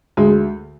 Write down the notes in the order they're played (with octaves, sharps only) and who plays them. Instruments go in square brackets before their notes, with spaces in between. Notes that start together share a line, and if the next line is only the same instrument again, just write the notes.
[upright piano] D2 G#3